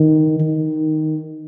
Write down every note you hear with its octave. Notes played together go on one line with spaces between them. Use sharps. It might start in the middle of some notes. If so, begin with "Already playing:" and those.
Already playing: D#3
D#3